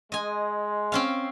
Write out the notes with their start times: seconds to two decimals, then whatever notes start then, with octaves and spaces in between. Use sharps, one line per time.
0.12 G#3 D#5 G#5
0.92 C4 C#4 F5